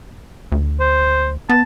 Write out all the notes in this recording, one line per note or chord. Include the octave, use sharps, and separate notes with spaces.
D2
C5
B3 A5